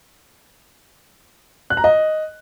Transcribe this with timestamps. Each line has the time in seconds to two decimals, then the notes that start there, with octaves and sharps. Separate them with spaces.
1.70 F#6
1.77 A#5
1.84 D#5